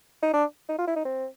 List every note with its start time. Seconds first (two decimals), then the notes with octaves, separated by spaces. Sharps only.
0.23 D#4
0.33 D4
0.69 D#4
0.78 F4
0.88 E4
0.96 D#4
1.05 C4